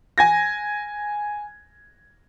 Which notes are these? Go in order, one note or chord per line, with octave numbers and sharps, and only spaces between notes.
G#5 G#6 A#6